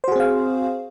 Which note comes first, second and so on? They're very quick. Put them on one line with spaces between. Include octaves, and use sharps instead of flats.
C5 F#4 G#4 C4 F5